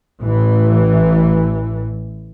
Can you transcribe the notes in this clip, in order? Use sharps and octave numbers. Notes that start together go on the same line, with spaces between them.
A1 E3